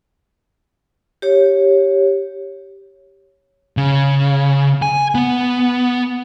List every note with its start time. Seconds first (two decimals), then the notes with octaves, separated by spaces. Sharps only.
1.22 G4 C#5
3.77 C#3
4.82 G#5
5.15 B3